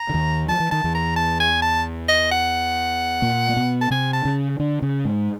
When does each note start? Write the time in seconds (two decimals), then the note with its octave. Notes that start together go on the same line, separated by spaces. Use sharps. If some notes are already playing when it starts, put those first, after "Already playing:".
Already playing: A#5
0.09 D3
0.14 D#2 D#3
0.48 F3 A5
0.60 E3
0.71 D#3 A5
0.84 E2 E3
0.94 A#5
1.16 A5
1.40 G#5
1.62 A5
2.08 D#5
2.31 F#5
3.22 A#2 A#3
3.49 A#3
3.57 B2 B3
3.81 A5
3.91 C3 C4 G#5
4.13 A5
4.25 C#3 C#4
4.59 D3 D4
4.82 C#3 C#4
5.05 G#2 G#3